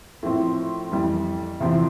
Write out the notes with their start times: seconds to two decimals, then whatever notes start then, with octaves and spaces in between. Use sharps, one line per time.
0.23 A2 F3 C4 E4
0.92 F2 E3 G3
1.60 E2 C3 F3 C4 E4